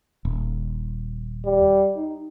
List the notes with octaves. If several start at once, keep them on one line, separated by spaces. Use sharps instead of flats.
D#1
G3
D#4